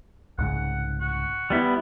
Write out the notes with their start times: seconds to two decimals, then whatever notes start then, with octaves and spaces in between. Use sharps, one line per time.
0.38 C2 G#2 C#3 F#5
1.00 F#4
1.50 G3 B3 E4